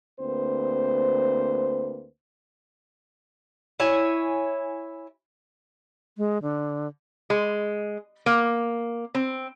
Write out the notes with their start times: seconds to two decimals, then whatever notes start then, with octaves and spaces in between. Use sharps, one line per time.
0.20 D2 A#3 C4 B4 C5
3.80 E4 C#5 G#5
6.18 G#3
6.42 D3
7.30 G#3
8.26 A#3
9.15 C4